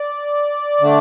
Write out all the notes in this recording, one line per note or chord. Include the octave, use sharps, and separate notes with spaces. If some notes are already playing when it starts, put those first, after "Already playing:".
Already playing: D5
D3 A3 D4